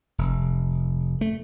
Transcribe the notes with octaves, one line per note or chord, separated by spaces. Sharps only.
F1
A3